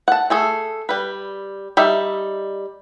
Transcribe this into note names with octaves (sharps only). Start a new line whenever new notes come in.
F#5 A5
A3 G#4 A4
G3 B4
G3 D#4 E5